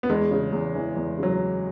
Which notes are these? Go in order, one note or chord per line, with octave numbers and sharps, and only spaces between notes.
B3
E2 G#3
C#3
E2
E3
E2
C#3 F#3